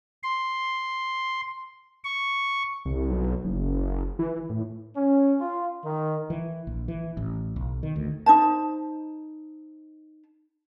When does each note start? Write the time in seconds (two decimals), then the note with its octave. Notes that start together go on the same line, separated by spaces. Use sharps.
0.23 C6
2.04 C#6
2.85 C2
3.10 B1
3.45 F#1
4.19 E3
4.50 A2
4.96 C#4
5.40 F4
5.84 D#3
6.30 E3
6.67 A#1
6.88 E3
7.17 A1
7.56 B1
7.83 D#3
7.96 D2
8.26 D#4 C5 A5